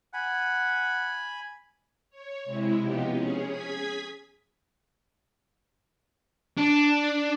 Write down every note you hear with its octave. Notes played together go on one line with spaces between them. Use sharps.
F#5 G#5 B5
C#5
C3 G#3 E4
C3 F3 B3 D#4 G4
C#4 G#4
G#4 G#6 B6
D4